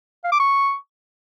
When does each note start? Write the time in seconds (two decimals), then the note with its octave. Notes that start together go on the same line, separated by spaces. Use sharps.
0.24 F5
0.32 D6
0.40 C#6